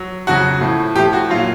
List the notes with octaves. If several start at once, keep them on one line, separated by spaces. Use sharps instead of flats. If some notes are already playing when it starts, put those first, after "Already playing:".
Already playing: F#3
F2 C#3 F#3 F#4
A2 F3
A2 F3 G4
F#4
A#2 F#3 F4